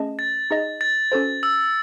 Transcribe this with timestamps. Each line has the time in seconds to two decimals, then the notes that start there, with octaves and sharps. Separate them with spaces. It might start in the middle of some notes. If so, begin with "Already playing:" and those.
Already playing: A3 C#4 G#4 D#5 A5
0.19 A6
0.51 D#4 G#4 D#5
0.81 A6
1.12 C#4 F#4 A4 C5
1.43 E6